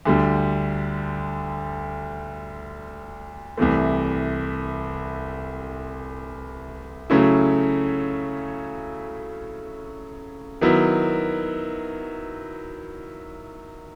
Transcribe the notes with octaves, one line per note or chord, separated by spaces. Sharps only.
D2 D3 G3
C2 C3 E3 A3
C#3 F#3 A3 C#4 E4
D#3 F#3 B3 E4